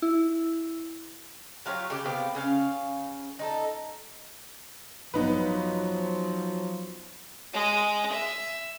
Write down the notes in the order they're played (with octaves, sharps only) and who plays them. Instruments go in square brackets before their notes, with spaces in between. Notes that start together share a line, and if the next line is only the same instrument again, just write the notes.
[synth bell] E4
[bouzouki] F#3 F4 G4 C#5
C#3 G4
C3 B3 F5 G5
C#3 C#4 F5
D#4 F4 A4
[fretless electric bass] A1 G2 [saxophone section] F3 F#3 [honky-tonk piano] B3 D#4 B4
[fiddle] G#3
E5